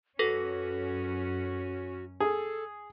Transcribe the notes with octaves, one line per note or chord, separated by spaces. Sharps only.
F#2 C#4 F#4 A4 B4 A#6
G#4 A4